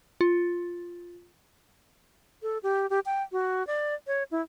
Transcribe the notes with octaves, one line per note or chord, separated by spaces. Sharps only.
F4
A4
G4
G4
G5
F#4
D5
C#5
E4